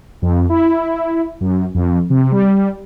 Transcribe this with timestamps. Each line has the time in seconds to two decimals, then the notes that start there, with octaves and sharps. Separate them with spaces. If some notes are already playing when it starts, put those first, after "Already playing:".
0.22 F2
0.49 E4
1.41 F#2
1.75 F2
2.10 C3
2.32 G3